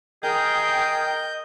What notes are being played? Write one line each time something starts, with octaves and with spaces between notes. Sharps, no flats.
G#4 A#4 D#5 G5 G6